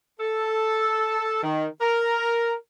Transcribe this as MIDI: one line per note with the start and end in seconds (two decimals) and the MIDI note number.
0.20 1.42 69
1.43 1.66 51
1.81 2.54 70